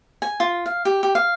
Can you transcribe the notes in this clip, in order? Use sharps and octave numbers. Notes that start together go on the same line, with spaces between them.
G#5
F4
F5
G4
G4
F5